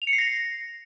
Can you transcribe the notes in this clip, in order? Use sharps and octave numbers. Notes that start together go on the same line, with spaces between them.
F7
C#7
C7
A#6